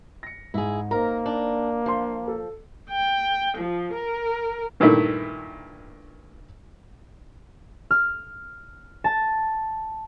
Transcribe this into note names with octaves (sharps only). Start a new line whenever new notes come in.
A#6 C#7
G#2 E4 G#4
A#3 D#4 A#4 C5 A#5
D4
F3 D4 C6
A4
G5
F3
A#4
G2 A#2 D#3 A3 E4
F6
A5